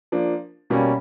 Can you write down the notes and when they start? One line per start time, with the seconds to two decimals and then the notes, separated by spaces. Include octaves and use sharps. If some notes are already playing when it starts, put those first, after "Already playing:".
0.12 F3 A#3 D4
0.70 B2 G3 A#3 C#4